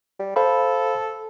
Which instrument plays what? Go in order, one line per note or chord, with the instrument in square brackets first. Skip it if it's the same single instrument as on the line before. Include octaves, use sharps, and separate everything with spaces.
[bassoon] G3
[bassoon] A4 [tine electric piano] C5 F5 B5